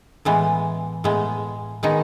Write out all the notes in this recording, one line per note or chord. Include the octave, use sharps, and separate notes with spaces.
A2 E3 G#3 B3
A2 G#3 B3
D#3 G#3 B3 D#4